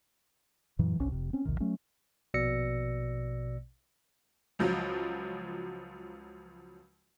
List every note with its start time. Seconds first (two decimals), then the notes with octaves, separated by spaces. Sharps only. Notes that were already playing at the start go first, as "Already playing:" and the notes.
0.79 F#2 A#2 E3 F#3
0.99 G1 C2 C#4
1.12 F1 C3
1.33 C4 C#4
1.45 A#1 D#2 C3 D#3
1.60 F#3 A3 C#4
2.34 A#1 B2 D5 E6 A#6 C#7
4.59 C#2 F3 F#3